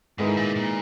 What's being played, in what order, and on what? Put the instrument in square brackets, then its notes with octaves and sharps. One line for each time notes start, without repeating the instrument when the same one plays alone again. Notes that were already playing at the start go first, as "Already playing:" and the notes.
[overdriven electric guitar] G#2 [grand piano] D#3 G#3 B3 E4
[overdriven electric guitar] A#2
A#2